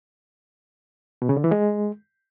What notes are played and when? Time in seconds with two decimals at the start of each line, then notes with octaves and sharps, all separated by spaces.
1.22 B2
1.29 C#3
1.37 D3
1.44 E3
1.51 G#3